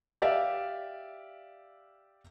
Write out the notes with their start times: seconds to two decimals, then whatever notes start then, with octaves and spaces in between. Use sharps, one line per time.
0.22 G4 D5 E5 F5